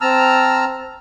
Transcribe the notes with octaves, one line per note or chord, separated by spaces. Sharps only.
C4 A5 A#5 E6 F6